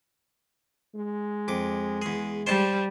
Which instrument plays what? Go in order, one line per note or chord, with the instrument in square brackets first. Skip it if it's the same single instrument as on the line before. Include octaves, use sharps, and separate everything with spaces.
[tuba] G#3
[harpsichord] F2 D6
E2 G#4
[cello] G3 [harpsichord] C5 A5